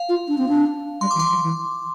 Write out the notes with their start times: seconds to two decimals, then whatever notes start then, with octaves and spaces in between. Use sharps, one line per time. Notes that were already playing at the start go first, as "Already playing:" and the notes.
Already playing: F5
0.09 F4
0.28 D4
0.38 C4
0.49 D4
1.01 G3 C6
1.11 D6
1.15 E3
1.19 C6
1.29 F3
1.42 E3